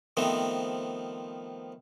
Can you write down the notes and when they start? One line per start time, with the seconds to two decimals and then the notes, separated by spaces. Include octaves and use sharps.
0.17 D#3 F3 A3 B3 C4